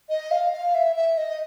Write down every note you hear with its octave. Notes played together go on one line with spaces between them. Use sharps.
D#5
F5
F5
E5
E5
D#5